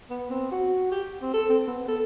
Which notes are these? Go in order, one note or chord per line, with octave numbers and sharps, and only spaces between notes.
B3
C4
F#4
G4
C4
A4
C4
B3
A4